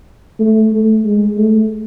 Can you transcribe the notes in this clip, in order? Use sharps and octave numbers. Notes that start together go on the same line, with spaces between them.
A3
A3
G#3
A3